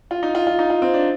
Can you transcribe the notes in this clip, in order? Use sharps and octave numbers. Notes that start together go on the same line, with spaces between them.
F4
D#4
F4
F4
D#4
F4
C4
D4